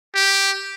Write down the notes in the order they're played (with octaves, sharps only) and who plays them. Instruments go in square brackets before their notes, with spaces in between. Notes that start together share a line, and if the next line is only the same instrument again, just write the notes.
[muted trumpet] G4